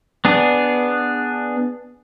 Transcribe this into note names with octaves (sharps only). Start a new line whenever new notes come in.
B3 D4 G#4